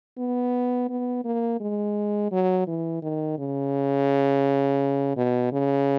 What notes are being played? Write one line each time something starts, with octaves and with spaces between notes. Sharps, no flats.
B3
B3
A#3
G#3
F#3
E3
D#3
C#3
B2
C#3